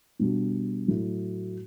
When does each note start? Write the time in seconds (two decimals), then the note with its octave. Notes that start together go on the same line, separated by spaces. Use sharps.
0.19 B2 G3 D4 F#4
0.88 A2 F#3 A3 E4